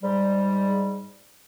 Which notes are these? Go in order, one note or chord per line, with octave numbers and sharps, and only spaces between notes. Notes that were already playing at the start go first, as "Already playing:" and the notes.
G#2 G3